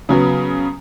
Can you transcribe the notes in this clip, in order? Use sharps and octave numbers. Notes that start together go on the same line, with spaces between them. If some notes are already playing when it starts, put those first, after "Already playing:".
C#3 F#3 B3